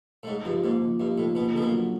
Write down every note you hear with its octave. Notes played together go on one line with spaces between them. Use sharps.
A2
G#2 D#4
G2 F3
G#2 A#3
F3
G2 D#4
A2 F3
B2 A#3
B2 D3
A#2
F#3